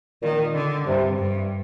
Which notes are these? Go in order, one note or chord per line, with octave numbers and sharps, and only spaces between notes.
A#2 D#3
D3
G2 C3
G2